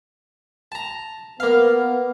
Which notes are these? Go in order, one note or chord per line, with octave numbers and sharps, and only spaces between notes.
A5 A#5
A#3 B3 F5